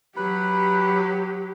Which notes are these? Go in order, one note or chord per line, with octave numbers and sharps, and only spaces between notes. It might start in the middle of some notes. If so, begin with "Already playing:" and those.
F#3 G4 B4 B5